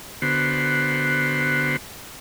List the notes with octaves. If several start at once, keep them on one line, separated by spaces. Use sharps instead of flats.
D3 B3 F#4 C5